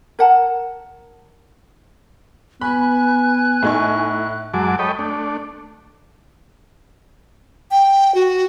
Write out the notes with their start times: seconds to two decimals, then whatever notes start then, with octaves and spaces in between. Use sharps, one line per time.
0.19 A#4 F#5 A5
2.61 B3 G#5 B5 F#6
3.62 A2 D#4 C#6
4.54 F#2 F#3 G#3 A5 D6
4.79 A4 C#5 D#5 G5 B5
4.99 A3 D4
7.71 G5
8.15 F#4